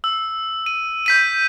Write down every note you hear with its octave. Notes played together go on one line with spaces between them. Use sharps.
E6
D#7
G6 B6 D#7